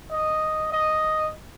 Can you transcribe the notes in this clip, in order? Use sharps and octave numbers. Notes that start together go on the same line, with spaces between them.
D#5
D#5